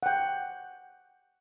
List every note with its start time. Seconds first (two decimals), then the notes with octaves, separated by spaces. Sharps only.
0.03 F#5 G5